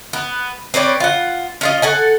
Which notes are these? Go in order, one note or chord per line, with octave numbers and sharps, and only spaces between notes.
B3
C4 B4 C#5 D5
F4 F#5
C#4 F4 D#5
A4 F#5 G#5